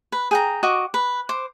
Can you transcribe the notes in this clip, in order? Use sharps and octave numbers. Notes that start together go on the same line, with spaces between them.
B4
G#4 G5 A#5
F#4 D#5 C#6 D6
B4
C5 D6